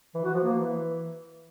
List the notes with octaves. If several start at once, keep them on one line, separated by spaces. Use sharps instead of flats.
E3
F#4
F3
A#3
E3